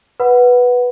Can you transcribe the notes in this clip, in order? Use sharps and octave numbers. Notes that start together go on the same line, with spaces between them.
B4 F#5 B5